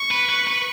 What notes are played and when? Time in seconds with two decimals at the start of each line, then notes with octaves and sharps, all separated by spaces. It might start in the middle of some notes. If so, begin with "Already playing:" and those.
Already playing: C#6
0.11 B4
0.30 B4
0.47 B4